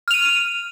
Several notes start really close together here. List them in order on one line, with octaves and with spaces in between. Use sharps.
F6 F7 D#7